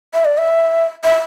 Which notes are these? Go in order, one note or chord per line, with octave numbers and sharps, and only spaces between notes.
E5
D5
E5
E5